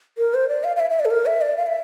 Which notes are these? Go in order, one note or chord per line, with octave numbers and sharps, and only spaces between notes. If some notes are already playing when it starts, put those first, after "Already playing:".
A#4
C5
D5
F5
F5
E5
E5
D5
A4
A#4
E5
D5
F5
E5